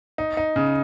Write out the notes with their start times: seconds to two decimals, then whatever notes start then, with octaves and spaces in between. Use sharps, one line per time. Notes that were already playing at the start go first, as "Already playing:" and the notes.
0.18 D#4
0.37 D#4
0.56 C#3